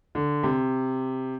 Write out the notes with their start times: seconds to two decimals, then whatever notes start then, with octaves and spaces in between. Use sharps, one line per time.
0.15 D3
0.43 C3